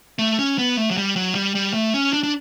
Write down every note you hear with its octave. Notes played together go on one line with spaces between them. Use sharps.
A3
C#4
B3
A3
F#3
G3
F#3
G3
G3
A3
C#4
D4
D4